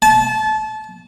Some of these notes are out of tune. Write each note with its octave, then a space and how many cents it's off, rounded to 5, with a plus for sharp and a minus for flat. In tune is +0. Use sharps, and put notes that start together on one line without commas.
A5 -25